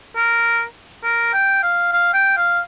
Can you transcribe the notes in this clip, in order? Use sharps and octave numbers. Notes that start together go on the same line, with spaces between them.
A#4
A#4
G5
F5
F5
G5
F5